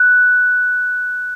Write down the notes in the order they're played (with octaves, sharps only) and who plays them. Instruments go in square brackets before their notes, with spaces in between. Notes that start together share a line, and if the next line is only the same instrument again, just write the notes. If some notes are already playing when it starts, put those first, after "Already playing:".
Already playing: [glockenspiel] F#6